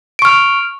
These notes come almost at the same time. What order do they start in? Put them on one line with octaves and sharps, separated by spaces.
D7 C#6 F6